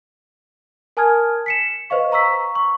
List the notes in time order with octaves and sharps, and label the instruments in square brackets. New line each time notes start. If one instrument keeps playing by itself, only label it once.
[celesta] A#4 G#5 A5 D#6 F6 G#6
B6 C#7 E7
B4 C5 D#5 F5 C#6
F5 A#5 C#6 E6 B6
C#6